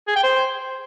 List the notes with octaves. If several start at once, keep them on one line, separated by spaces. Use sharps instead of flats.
G#4
G5
C5